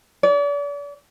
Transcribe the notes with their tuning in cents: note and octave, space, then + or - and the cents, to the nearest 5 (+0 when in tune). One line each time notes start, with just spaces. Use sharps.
D5 -40